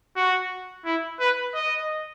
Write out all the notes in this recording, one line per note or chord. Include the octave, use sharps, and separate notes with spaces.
F#4
E4
B4
D#5